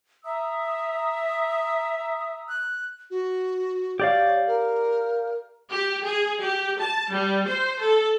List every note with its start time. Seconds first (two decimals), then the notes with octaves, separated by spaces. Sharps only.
0.25 E5 A#5 D#6 E6
2.49 F#6
3.11 F#4
4.00 G4 C#5 D5 F5
4.47 A#4
5.70 G4
6.05 G#4
6.41 G4
6.80 A5
7.11 G3
7.47 C5
7.79 A4